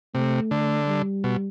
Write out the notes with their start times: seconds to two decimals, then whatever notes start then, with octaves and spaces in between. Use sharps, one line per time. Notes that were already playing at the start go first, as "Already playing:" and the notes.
0.14 C3 A3
0.51 D3
0.87 G3
1.24 B2